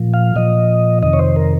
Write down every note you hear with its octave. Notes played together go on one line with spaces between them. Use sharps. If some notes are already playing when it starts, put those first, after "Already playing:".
Already playing: A#2 F3
F5
A#2 F3 D#5
F2 C3 D#3 D#5
C#5
C5
A#4